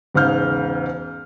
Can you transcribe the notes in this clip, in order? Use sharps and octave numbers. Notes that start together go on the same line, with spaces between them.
E1 G#2 C#3 F5 F6 G6